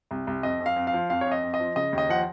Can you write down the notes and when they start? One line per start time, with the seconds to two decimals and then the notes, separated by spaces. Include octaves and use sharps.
0.11 C2
0.27 C2
0.43 F2 D#5
0.60 F2
0.66 F5
0.76 F2
0.87 F5
0.93 F3
1.10 F2 F5
1.21 C#5
1.26 F2
1.32 D#5
1.43 F2
1.54 D#5
1.60 F3
1.76 C#3 D#5
1.93 D#2
1.98 D#5
2.09 F3 F#5